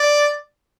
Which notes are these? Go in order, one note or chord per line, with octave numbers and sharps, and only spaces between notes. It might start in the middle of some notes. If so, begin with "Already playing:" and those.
Already playing: D5